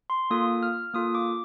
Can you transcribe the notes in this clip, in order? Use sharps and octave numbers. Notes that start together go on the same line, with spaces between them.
C6
A#3 F4 A4 D#6
F6
A#3 F4 A4 D#6
D6